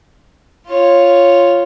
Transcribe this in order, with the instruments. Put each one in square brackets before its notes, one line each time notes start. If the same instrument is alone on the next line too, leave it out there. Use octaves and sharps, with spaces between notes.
[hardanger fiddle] F4 C#5